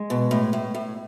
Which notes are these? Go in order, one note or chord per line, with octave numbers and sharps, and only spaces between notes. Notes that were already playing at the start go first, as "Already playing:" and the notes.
Already playing: G#3
B2
A2
A2
A2